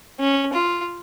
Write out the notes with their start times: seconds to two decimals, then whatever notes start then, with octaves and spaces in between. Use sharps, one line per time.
0.20 C#4
0.53 F4